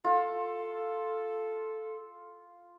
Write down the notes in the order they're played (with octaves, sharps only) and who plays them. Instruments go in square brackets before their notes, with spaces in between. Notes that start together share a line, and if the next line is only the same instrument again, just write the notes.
[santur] F4 [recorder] A4